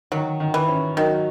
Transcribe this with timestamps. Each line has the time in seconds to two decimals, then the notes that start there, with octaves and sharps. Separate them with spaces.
0.12 D#3 F#3
0.40 D#3
0.54 E3
0.68 C#4
0.97 D#3 F#3